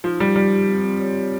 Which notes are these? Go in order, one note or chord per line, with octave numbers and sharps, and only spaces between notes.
F3 D#4
G3 G4
G3 G4
G4
C4
C4
C#5
C#5